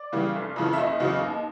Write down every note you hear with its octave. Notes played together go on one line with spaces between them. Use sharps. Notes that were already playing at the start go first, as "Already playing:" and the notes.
Already playing: D5
C#3 E3 G3
F1
F2 C#3 E3
E5
F#1 D#5
E2 C#3 F#3
D#2